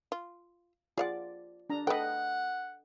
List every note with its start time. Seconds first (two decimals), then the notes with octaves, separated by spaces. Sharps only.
0.12 F4
0.98 F4 G#4 D5 F5 F#5
1.70 D4 A#5
1.87 A3 A4 B4 D#5 F#5 G5